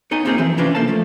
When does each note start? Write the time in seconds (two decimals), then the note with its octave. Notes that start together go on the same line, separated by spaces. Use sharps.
0.11 B3 D#4 C#5 D#5 G#5 A#5
0.25 A#3 C4 D#4 F4 G#4 A#4
0.38 E3 F3 C4
0.57 C3 E3 C#4 D4 F4
0.75 F3 A#3 C#4 A4 C5 A5
0.88 F3 A3